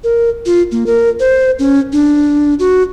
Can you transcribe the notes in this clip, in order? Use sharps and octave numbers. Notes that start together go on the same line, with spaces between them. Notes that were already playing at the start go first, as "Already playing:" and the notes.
A#4
F4
A#3
A#4
C5
C#4
D4
F#4